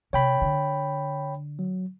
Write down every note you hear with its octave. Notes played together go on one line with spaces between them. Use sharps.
C3 C#5 G5 B5
D3
F#3